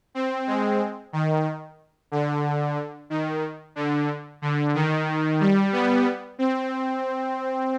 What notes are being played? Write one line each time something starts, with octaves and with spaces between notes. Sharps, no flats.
C4
G#3
D#3
D3
D#3
D3
D3
D#3
G3
B3
C4